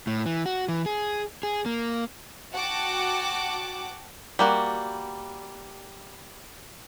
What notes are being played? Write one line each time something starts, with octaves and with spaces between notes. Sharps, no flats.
A2
E3
F#4
E3
G#4
G#4
A#3
F#4 F#5 G5 A5 D6
G3 A#3 F#4